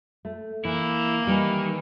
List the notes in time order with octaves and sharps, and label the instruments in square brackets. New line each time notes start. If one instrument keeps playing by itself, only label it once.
[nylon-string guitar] A3
[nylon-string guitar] E3 [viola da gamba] A#3 [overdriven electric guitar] E4
[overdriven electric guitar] D#3 [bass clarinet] E3 [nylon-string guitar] G3